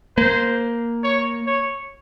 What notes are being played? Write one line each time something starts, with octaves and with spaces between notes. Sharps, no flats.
A#3 C5
C#5
C#5